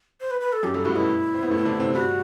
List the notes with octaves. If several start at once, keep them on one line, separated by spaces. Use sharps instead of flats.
C5
B4
B4
A4
F#2 F#3 G4
G2 G3 A4
A2 A3 F#4
B2 B3 E4
C4
B3
A2 A3
C4
D3 D4
C3 C4
G2 G3 F#4